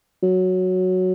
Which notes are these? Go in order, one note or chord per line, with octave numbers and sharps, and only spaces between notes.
F#3